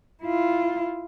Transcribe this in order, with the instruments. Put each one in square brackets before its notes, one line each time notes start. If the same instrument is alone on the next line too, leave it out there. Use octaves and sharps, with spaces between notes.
[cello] E4 F4